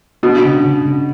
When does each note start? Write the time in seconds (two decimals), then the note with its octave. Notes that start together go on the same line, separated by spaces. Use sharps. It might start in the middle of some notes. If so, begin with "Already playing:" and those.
0.23 B2 D4
0.44 C#3
0.64 C#3
0.84 C#3